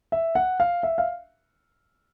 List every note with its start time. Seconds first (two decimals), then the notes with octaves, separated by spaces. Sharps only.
0.12 E5
0.35 F#5
0.60 F5
0.83 E5
0.98 F5